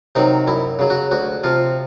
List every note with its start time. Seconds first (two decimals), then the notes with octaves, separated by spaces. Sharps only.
0.15 C3 D#3 F#3 D#4
0.48 F#2 E4
0.79 C#3 F#3
0.90 F#4
1.11 D2 F#4
1.44 C3 F3 F4